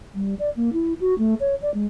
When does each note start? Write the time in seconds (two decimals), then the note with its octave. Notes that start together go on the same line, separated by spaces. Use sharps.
0.15 G3
0.39 D5
0.56 A#3
0.73 E4
1.01 F#4
1.18 A3
1.40 C#5
1.62 D5
1.74 G#3